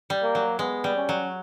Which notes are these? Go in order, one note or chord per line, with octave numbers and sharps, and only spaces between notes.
G3
A#3
F#3
G#3 B3
G3
C#4
F#3